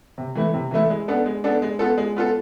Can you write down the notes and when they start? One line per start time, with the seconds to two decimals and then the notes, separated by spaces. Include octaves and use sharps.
0.18 C3
0.35 E3 A3 E4
0.54 C3
0.71 E3 A3 E4
0.90 G#3
1.08 B3 D4 A4
1.26 G#3
1.44 B3 D4 A4
1.62 G#3
1.79 B3 F4 A4
1.98 G#3
2.16 B3 F4 A4